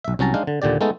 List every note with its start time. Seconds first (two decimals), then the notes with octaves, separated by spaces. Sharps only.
0.04 B1 E5
0.19 C2 F#3 C#4 A5 A#5
0.34 G#3 D4 D#4 F5
0.47 D3
0.62 D#2 A#2 D3 G4 D5
0.81 G#3 A3 B3 D#4 A4